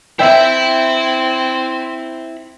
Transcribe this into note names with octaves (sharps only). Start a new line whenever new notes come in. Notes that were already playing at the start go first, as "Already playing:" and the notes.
C4 E4 E5 G5 B5